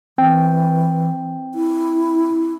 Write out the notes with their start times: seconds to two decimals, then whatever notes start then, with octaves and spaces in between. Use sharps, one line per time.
0.18 E3 C4 G5
1.55 E4